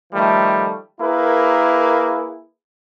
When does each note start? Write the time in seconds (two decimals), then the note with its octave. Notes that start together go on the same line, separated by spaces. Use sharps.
0.13 D#3 F3 G3 A3
1.00 A#3 E4 G#4 A#4 B4